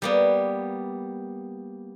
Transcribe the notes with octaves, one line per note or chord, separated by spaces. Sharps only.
G3 A#3 B3